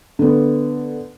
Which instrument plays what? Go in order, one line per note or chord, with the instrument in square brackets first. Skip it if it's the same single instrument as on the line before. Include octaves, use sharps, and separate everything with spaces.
[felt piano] D3 B3